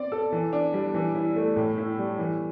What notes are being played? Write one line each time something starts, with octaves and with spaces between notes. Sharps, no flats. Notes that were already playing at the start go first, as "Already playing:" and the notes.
Already playing: C4 D5
A4
E3
D4
G3
E3
E4
A3
A2
E4
G3
E3